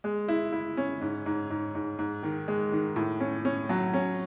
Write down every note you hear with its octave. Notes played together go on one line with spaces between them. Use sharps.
G#3
E4
E4
C#4
G#2
G#2
G#2
G#2
G#2
D#3
G#3
D#3
A2
C#4
C#4
F#3
C#4